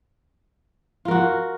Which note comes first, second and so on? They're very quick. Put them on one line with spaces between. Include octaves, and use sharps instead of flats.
F4 A#4 F#4